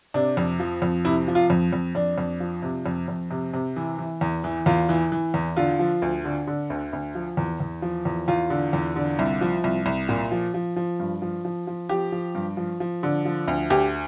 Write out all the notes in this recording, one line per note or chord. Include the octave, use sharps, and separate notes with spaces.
C3 D4
F2
F3
F2
C3 E4
F3
F4
F2
F2
F2 D4
F2
F3
C3
F2
F2
C3
C3
E3
E3
E2
E3
E2 F4
E3
E3
E2
D3 F4
F3
D2
D3
D3
D2
D2
F3
E2
E2
F3
E2
E2 F4
D3
E2
D3
C2
F3
C2
C2
A#2
F3
F3
F3
G2
F3
F3
F3
F3 G4
F3
G2
F3
F3
D3
F3
D2
D2 G4